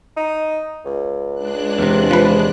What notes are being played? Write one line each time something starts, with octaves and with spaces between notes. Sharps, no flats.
D#4
C#2
G#3 D4 F#6
E2 C3
F3 B4